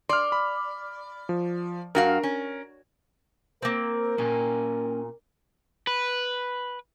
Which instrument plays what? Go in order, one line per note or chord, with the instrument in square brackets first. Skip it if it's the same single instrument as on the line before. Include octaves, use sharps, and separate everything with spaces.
[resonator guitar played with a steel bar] D5 [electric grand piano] C6 F6
[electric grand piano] B5
F3
[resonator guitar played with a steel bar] G2 F#4 F5 [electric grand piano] A#4
[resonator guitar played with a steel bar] C#4
[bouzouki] A#3 C4 [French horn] A#4
[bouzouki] A#2 [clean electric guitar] A#3 C#4 G#5
[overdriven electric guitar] B4